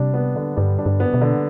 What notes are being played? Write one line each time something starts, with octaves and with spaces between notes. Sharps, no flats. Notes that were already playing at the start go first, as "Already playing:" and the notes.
Already playing: C3 G3 D4
B3
D3
G2 G3
D4
G2
B3
B2
D3